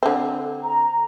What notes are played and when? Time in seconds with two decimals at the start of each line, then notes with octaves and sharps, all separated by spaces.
0.03 D3 C4
0.63 A#5